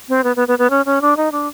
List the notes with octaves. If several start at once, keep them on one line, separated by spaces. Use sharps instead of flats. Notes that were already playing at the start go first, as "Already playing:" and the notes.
C4
B3
B3
B3
B3
C#4
C#4
D4
D#4
D4